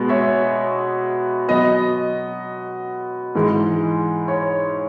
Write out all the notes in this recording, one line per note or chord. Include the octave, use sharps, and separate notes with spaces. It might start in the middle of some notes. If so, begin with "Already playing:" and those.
Already playing: B2 G#3 B3
C#5 E5
B2 F#3 B3 D#5
G#2 E3 G#3
C#5